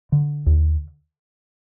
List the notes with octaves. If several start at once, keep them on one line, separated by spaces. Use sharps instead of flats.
D3
D#2